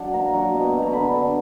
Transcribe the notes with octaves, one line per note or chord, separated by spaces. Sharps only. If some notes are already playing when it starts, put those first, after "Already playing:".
Already playing: F#3 D4 F#5
A#3 A#5
F#3
B2
B2
A#5
D3 B5
D3